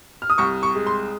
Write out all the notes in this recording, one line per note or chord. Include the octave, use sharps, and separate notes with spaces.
F6
D#6
C2 C#6
C#6
G#3
C6